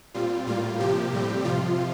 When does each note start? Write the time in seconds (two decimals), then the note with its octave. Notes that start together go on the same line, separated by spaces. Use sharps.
0.14 A#2 G3 C4 F4
0.46 A2 G3 A#3 F4
0.79 C3 F3 A#3 G4
1.13 A2 G3 C4
1.45 F2 C3 F3 F4